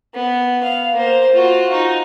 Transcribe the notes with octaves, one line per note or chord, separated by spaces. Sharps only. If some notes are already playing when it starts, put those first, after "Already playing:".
B3
F5
A#3 C5
F4 F#4
D#4